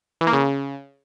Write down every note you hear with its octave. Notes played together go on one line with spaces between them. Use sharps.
E3
A#3
C#3